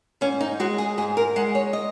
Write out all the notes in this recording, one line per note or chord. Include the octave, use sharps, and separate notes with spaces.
G#2 C#4
D#4
G#3 F#4
G#4
G#2 G#4
A#4
G#3 F#5
C#5
D#5